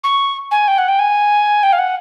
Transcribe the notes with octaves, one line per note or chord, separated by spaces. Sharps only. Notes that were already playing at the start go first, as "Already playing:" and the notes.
C#6
G#5
G5
F#5
G5
G#5
G5
F5
F#5